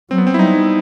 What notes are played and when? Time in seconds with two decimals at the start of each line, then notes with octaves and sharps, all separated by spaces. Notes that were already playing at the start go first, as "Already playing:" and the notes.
0.10 F#3 C4
0.18 B3
0.27 C4
0.34 E4
0.39 G3 D#4